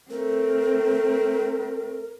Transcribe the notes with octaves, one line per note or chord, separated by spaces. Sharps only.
A3 C4 A#4